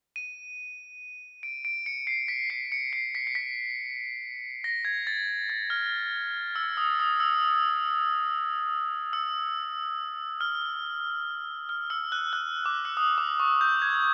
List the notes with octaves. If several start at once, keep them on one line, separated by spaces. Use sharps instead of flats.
D#7
D7
D7
C#7
C7
B6
C7
C#7
C7
B6
C7
B6
A#6
G#6
A6
A6
F6
E6
D#6
D#6
E6
E6
F6
F6
E6
F#6
F#6
D6
E6
D#6
D6
C#6
G6
G#6